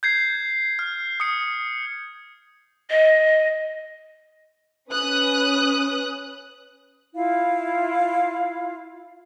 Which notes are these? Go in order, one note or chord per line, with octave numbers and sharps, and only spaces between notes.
G6 G#6 C7
F6
D#6 C#7
D#5
C#4 B4 D#6 F#6
E4 F4 F5